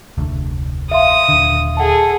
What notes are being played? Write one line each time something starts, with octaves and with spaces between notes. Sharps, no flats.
F1 D2
E5 F5 C6 D#6
D#1 D3
G#4 A4 F#5 A5